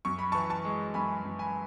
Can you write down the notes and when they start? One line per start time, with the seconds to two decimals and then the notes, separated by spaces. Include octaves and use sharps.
0.05 F#2 C#6
0.19 B5
0.32 E3 A5 C#6
0.50 A5 C#6
0.65 G#3
0.94 F#2 G#5 B5
1.25 F#2
1.39 G#5 B5